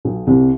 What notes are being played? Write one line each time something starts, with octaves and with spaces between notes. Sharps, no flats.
B1 B2
C2 C3